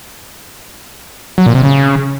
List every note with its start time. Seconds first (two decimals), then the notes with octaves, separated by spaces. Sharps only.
1.38 F#3
1.46 A#2
1.55 C3
1.63 C#3